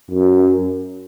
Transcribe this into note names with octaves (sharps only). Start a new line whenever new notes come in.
F#2